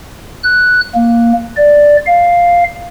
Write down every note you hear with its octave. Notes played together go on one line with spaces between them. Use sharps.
F#6
A#3
D5
F5